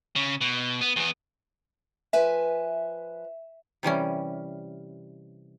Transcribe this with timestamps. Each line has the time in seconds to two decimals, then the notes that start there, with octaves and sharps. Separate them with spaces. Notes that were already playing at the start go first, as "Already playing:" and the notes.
0.16 C#3
0.41 B2
0.81 B3
0.96 E2 B3
2.13 F3 B4 E5 G#5
3.83 C3 E3 G3 C#4